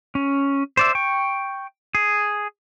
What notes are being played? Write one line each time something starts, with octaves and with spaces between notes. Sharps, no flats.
C#4
C5 D5 E5
G5 C#6
G#4